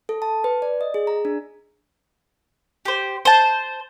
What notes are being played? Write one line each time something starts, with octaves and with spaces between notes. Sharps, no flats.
A4
A5
B4
D5
D#5
G#4
A#5
D4
G4 C5
C5 A5